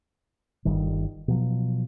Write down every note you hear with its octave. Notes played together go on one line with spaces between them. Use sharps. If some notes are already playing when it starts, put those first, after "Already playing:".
G1 D#3 G3
B2 F3 F#3